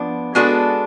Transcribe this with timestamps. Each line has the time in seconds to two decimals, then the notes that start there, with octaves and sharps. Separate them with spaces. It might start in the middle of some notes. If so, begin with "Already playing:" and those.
Already playing: F3 B3 D4
0.35 G#3 B3 D4 F#4 A4